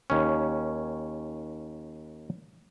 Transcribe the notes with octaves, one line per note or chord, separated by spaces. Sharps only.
D#2 C#4